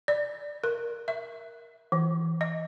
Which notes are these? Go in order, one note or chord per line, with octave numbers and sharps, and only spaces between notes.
D5
A#4
E5
E3
D#5